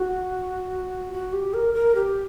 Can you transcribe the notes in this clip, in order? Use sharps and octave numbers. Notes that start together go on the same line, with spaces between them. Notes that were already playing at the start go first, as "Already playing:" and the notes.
Already playing: F#4
F#4
G4
A#4
A#4
G4